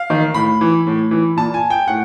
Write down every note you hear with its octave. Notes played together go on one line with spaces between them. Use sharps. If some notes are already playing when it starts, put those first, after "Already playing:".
Already playing: F5
D#3
A2 B5
E3
A2
E3
A#2 A5
G#5
G5
A2 F#5